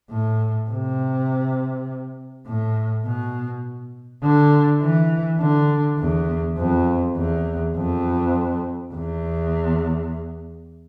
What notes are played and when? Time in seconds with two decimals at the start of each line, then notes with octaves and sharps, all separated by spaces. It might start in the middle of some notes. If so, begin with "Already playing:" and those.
0.11 A2
0.70 C3
2.47 A2
3.06 B2
4.23 D3
4.81 E3
5.40 D3
5.99 E2
6.58 F2
7.17 E2
7.76 F2
8.94 E2